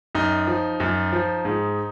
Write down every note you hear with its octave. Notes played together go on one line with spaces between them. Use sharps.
F#2 D#4
F3
F#2
F3
G#2